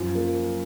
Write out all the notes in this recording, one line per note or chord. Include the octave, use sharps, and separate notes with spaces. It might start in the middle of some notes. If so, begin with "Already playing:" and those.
Already playing: F#2 F3
A#3